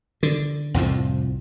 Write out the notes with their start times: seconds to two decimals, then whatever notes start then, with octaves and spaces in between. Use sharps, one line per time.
0.23 D3
0.74 C2 F2 A2 F3